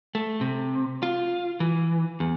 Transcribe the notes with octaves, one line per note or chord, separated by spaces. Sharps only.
A3
C3
F4
E3
E2